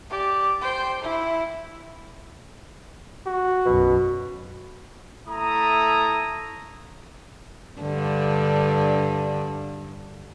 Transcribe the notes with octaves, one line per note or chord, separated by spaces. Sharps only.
G4 D5
C5 G5
E4
F#4
B1 F#2 B2
A3 E4 A#5 D#6
G2 D3